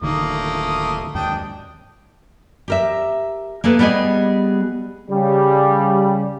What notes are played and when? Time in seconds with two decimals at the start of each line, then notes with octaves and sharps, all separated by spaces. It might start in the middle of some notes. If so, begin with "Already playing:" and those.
0.02 D1 D3 D#3 A3 A#3 D#6
1.15 D#2 G#2 D4 G5 D#6
2.68 G4 A#4 E5
3.64 A#3 G#4 A4 B4
3.79 G3 B3 G4 G#4 D#5
5.10 C#3 G3